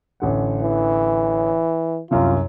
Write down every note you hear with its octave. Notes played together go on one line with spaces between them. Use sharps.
A1 D3 F#5
E3
C2 F#2 F4